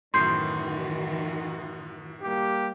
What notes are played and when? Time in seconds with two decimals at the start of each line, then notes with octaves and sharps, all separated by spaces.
0.14 F#2 A2 D#3 E3 F#4 C6 G6 C7
2.23 G3 A#3 G4